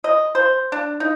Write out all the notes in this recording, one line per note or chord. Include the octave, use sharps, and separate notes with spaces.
D#5
C5
D4
D#4